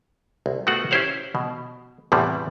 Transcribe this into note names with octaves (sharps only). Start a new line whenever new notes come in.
C2
A3 B3 F4 F#4 F#5
C#4 E4 G4 C5 C#5 F#5
B2
E2 A2 C3 G3 A3